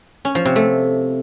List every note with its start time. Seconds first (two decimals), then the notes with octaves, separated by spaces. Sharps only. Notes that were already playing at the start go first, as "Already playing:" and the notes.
0.25 C#4
0.35 F3
0.45 C3
0.56 A3